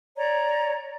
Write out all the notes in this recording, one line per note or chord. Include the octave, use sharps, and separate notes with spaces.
C#5 D5 A#5